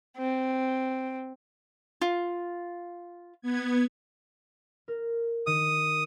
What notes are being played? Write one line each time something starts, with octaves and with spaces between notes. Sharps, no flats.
C4
F4
B3 G#6
A#4
D#3 D#6